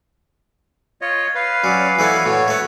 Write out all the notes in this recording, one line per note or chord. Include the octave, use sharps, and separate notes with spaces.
F4 C#5 D#5
B4 F5
F#3 C#4 D5
E3 A3 B3 E4 G#5
A2 F#4 C#5
A3 B3